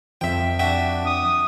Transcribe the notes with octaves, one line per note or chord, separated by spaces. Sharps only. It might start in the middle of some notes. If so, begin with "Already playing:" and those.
F2 F3 E5 G5
D4 F#4 E5 G5
D#6